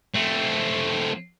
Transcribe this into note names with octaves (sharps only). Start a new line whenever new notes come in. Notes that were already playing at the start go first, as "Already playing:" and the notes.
A3 C4